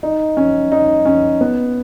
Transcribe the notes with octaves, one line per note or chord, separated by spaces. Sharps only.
D#4
C#4
D#4
C#4
B3